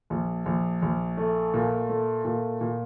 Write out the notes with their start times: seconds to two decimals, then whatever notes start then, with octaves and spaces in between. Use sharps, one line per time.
0.10 A#1
0.46 A#1
0.82 A#1
1.17 A3
1.54 A#2
1.89 A3
2.25 A#2
2.61 A#2